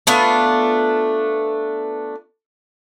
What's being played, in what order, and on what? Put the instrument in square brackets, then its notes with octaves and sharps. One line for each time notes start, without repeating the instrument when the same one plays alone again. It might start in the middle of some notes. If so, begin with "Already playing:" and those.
[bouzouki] A3 B3 D4 F4